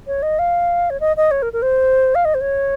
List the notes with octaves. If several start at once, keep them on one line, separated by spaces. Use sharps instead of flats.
C#5
D#5
F5
C#5
D#5
D#5
C#5
A#4
A#4
C5
F5
D#5
C5
C#5